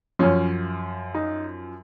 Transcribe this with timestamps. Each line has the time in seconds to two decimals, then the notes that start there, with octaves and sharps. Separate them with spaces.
0.19 F#2 F3 C#4
1.15 D#4